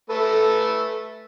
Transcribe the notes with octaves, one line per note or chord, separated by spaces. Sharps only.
A3 A4 B4